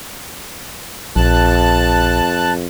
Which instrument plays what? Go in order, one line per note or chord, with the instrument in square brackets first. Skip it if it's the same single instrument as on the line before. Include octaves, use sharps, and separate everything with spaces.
[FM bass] A#1 [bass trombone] F2 [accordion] A5 F#6